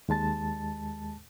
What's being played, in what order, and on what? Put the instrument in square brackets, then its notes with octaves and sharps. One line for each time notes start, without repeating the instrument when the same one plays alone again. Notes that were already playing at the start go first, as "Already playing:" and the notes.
[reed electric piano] D#2 G#3 A5 A6